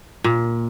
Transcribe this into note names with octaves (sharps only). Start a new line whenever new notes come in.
A#2